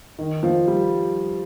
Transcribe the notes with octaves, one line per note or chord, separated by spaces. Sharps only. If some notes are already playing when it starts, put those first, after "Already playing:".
D#3
F3
G3